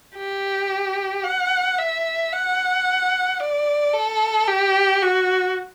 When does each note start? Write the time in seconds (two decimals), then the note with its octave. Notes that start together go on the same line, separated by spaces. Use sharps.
0.16 G4
1.23 F#5
1.78 E5
2.32 F#5
3.40 D5
3.94 A4
4.48 G4
5.02 F#4